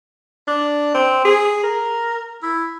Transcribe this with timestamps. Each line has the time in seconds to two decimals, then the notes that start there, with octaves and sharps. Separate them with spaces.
0.48 D4
0.94 C4
1.25 G#4
1.63 A#4
2.42 E4